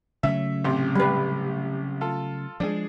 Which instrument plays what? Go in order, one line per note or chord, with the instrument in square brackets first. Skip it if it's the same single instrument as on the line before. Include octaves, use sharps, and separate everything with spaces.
[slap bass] C#3 F#3 A3 [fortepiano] E5
[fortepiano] A1 C3 C6
[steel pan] G3 B4
[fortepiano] F4 A4
[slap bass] F3 F#3 G#3 [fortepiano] D4 G#4